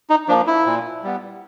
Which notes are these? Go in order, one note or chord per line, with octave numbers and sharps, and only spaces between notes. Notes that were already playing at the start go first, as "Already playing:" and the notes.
D#4
F3 A#3 D4
E4
A#2
G3 B3